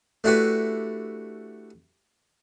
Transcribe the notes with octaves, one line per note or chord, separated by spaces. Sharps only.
A3 D4 E4 F#4 G4 B4